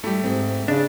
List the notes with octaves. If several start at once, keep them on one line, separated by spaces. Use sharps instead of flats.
G3 A3 E4 G4
G#2 C4
C#3 D4